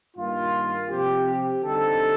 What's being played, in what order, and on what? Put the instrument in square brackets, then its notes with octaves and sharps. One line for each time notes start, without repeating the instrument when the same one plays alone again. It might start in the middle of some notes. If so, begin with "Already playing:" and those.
[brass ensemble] G2 D#3 A#3 F4
C3 F3 C4 G4
G4
D3 G3 C4 D#4 A4